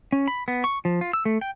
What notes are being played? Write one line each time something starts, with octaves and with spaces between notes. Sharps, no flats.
C#4
B5
B3
C#6
F3
F4
E6
A3
G5